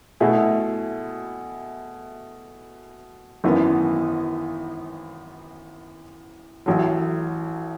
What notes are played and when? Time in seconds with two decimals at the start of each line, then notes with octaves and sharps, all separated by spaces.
0.20 B2 A3 E4 G#4
3.44 G#1 F#2 E3 B3
6.66 A1 A2 F#3